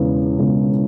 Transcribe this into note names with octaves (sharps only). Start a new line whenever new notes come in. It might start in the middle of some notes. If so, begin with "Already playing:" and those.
Already playing: E1 E2 C#3
E1 E2 C#3